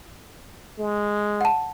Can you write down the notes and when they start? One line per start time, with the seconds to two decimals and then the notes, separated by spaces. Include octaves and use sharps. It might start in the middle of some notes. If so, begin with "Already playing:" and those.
0.79 G#3
1.41 F#5 A5